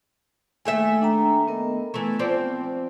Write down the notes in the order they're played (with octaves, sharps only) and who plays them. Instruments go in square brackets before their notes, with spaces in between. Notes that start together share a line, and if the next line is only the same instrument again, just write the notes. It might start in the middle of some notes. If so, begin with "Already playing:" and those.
[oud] D#2 A3 E5 [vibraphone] G#5
[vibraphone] D4 G5 A#5
B3 A#4 D#5
[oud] E3 A3 [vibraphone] B3
[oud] F3 C4 D5